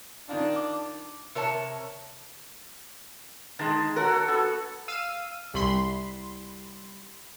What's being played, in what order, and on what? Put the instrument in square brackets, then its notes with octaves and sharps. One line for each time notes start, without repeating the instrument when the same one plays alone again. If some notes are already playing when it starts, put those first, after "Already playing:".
[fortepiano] D#3 D#4 F4 [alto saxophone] D4
[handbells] D6
[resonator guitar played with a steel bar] C3 A#4 C#5 A5
[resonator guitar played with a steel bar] D#3 G#3 [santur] A5
[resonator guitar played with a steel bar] F#4 A#4 [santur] A4 C#5 F#5
[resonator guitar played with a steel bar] B3 F#4 A4 [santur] E6
[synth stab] F5 E6 D#7
[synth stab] C2 B5 C6 [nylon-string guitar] G3